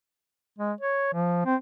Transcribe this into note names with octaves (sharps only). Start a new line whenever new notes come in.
G#3
C#5
F3
C4